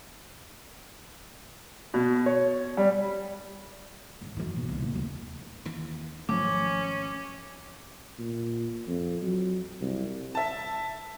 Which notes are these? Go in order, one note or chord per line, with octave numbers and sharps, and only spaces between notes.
B2
C#5
G3
G#2 D#3
F#2 D#3
B2 D#3
F#1 C2
A#2
D#2 A3
D#2 E3
G#1 F3 F#3 A3 C#4 D6
A#2
F2
F#3
C2
E5 A5